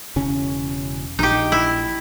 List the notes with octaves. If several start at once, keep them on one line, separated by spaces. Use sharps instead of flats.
E1 C#3 C#4
A#1 D#4 G4
E4